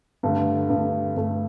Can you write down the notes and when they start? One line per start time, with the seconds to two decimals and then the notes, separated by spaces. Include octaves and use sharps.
0.23 G2 D3 A3
0.70 G2 D3 A3
1.16 G2 D3 A3